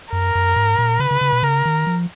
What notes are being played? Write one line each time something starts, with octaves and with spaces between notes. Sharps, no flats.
F#2 A#4
F#2
G#2
A#2
C#3 B4
C#3
C#3
B2
C#3 A#4
D#3
F3